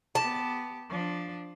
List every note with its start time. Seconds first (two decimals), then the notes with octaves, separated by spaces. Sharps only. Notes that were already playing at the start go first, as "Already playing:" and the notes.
0.15 B3 G4 A5
0.89 F3 D4